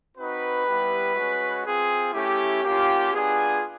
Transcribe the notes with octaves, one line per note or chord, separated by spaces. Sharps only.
C4 D#4 F#4 B4
G3 B3 E4 G4
G#3 C#4 F#4
C4 F4 G#4
A3 C#4 E4 G4
A#3 C#4 F4 G4
B3 D4 F4 G#4